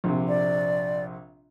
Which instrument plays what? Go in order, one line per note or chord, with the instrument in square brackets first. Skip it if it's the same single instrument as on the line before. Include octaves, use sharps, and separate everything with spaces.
[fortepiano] A#1 C3
[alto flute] D5